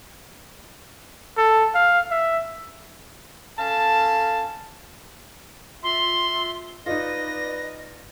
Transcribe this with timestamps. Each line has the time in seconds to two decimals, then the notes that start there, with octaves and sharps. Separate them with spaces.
1.37 A4
1.75 F5
2.11 E5
3.59 C#4 A4 F5 A5
5.83 F4 E5 C6
6.86 D#4 F4 B4 D5 D#5 A#6